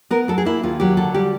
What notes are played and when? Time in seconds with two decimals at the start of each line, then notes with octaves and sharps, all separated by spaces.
0.11 B3 A#4
0.28 F#3 A4
0.38 G#4
0.45 A#3 E4
0.63 D#2 F4
0.80 F#3 G4
0.97 D3 A4
1.14 G3 G4